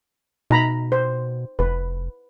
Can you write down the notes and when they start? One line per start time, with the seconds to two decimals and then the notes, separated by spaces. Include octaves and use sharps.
0.50 B2 D#4 A#5 B5
0.92 C5
1.59 F1 B4